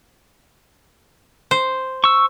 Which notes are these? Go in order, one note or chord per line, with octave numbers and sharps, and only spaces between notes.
C5
C#6 E6